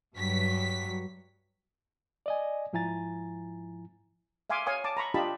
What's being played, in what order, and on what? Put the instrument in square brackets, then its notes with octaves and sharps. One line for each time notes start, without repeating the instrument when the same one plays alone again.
[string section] G2 F#3 B6
[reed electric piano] D5 D#5 G#5
G#2 F3 E4 G#5 A#5 A6
[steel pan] E5 F5 G#5 C6 D6
C#5 F5 G#5 C#6 D#6
A5 D6
A#5 B5 C#6
D4 F4 G4 D#5 A5 B5